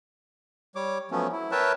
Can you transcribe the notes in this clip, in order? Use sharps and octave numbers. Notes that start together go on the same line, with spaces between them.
G3 C#5 D6
F3 F#3 A3 B3 C#4
E4
A#4 B4 C#5 E5 G5 A5